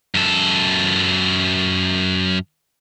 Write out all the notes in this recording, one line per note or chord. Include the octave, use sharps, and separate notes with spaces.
F#2 A4